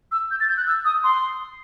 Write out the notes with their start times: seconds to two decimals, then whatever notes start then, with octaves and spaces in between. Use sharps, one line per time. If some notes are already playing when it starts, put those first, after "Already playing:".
0.12 E6
0.31 G6
0.40 A6
0.49 G6
0.57 F#6
0.67 E6
0.85 D#6
1.04 C6